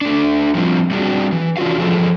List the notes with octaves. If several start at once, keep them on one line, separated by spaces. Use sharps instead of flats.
A3 D4
F3 G3 C4 F4
G3 C4 D4 F#4 G#4
E3
C#4 D4 F4 F#4 F5
E2 F3 G#4 A4